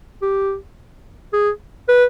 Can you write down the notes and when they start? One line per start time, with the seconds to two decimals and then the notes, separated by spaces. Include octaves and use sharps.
0.22 G4
1.33 G#4
1.89 B4